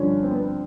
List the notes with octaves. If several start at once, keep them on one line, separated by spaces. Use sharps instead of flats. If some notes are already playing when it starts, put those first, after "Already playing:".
Already playing: G2 D3 F3 C#4
C4
B3
C4